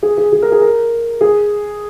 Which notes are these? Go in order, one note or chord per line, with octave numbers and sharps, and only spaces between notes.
G#4
G#4
G#4
A#4
G#4
A#4
G#4